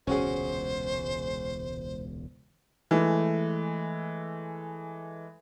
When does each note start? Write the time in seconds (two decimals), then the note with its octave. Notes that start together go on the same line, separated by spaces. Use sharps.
0.07 E1 C#2 A#2 C#4 F#4 G#4 C5
2.91 E3 G#3 A3